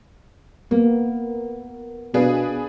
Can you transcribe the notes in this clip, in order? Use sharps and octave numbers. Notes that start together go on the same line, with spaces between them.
A#3 B3 A#4
B2 D4 G#4 B4 F5